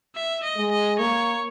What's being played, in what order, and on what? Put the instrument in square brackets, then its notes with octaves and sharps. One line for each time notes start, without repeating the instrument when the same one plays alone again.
[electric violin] E5
D#5
[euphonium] G#3
[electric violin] D#5
[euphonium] A#3 [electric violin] C#5